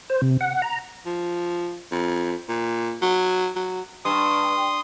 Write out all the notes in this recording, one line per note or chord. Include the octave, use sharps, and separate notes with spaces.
C5
C3
F#5
A#5
F3
F2
A#2
F#3
F#3
G2 C6 D#6